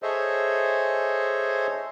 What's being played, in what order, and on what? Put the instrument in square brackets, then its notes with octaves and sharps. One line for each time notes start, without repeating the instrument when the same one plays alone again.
[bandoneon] G#4 A4 C5 C#5 D#5 E5